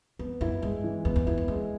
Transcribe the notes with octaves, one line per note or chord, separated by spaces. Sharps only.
F2 B3
F#2 E4
G2 G#3
E3
F2 B3
E2
F2 E4
E2
F2 G#3